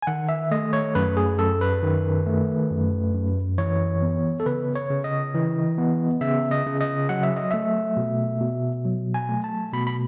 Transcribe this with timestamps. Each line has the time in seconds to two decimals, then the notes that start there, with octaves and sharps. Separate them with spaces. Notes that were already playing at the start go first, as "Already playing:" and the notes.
0.02 G#5
0.07 D#3 F#5
0.29 E5
0.51 A3 D#5
0.73 C#5
0.95 F#2 B4
1.17 G#4
1.38 F#2 A4
1.61 B4
1.82 D#3
2.27 A3
2.70 F#2
3.14 F#2
3.58 E3 C#5
4.02 B3
4.40 A4
4.46 C#3 B4
4.76 C#5
4.90 C#3
5.04 D#5
5.34 E3
5.78 B3
6.21 C#3 E5
6.51 D#5
6.66 C#3
6.80 D#5
7.09 F#3 F#5
7.23 E5
7.37 D#5
7.51 A3 E5
7.97 B2
8.41 B2
8.85 F#3
9.14 G#5
9.29 A3
9.44 A5
9.73 B2 B5
9.87 B5